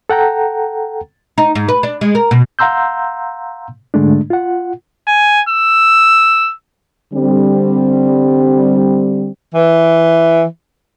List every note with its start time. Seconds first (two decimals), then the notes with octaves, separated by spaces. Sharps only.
0.10 A4 F#5 G5 A#5
1.38 D#4
1.55 G#2
1.68 B4
1.83 D4
2.01 G#3
2.15 A#4
2.31 B2
2.59 F5 F#5 A#5 C6 E6 G6
3.94 G#2 D3 G#3 A3 D4
4.30 F4 F#5
5.07 G#5
5.49 E6
7.13 D3 G3 C4
9.55 E3